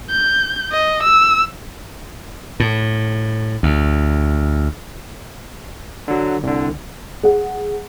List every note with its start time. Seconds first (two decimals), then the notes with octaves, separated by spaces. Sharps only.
0.10 G6
0.72 D#5
1.03 E6
2.60 A2
3.63 D2
6.08 D3 F#3
6.43 C2 D3
7.23 G#4 F#5